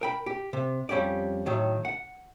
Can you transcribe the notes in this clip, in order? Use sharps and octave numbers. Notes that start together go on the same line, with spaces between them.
A#4 G5 B5
G4
C3
F2 G3 C#4 G4 D5
A2 D#3 F#3
F#5